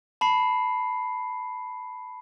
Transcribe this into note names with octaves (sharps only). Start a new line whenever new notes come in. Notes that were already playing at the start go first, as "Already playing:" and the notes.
A5 B5 C7